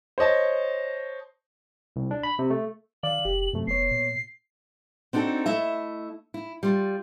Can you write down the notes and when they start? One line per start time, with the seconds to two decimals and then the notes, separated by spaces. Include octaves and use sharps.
0.18 C5 C#5 D#5 A5
1.96 C2
2.11 D4
2.23 B5
2.39 C3
2.50 A3
3.03 D#3 D5 F5 F#7
3.25 F1 G4
3.53 F#2 C3 F#3 A3
3.67 F1 B3 C#5 C7
3.91 A#2
5.13 C4 D4 D#4 F#4 A4
5.46 A3 E4 D#5 E5
6.34 E4
6.63 G3 F4